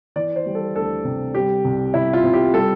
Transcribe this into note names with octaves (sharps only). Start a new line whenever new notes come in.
E3 D5
C5
G3
A4
D2 A4
C3
G3 G4
C2
C2 E4
F4
C3
G4
G3 A4